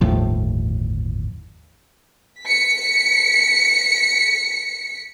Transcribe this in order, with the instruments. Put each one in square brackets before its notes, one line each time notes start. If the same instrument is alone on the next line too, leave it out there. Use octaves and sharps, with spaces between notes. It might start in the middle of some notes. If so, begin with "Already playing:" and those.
[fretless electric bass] G1 D#2 A2 F3
[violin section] B6 C#7